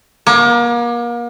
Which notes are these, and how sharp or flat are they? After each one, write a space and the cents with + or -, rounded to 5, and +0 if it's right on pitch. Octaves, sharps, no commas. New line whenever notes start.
A#3 +35